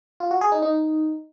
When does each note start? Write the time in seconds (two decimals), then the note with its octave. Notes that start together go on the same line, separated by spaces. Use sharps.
0.20 F4
0.31 F#4
0.41 G#4
0.52 D#4
0.62 D#4